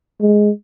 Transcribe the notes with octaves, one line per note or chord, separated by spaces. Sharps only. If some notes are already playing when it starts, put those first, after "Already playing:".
G#3